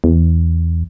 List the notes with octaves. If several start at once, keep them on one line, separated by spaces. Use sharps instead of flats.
E2